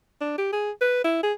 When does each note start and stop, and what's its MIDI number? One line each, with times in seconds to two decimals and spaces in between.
0.21 0.33 62
0.38 0.51 67
0.52 0.71 68
0.81 1.04 71
1.04 1.19 64
1.23 1.33 68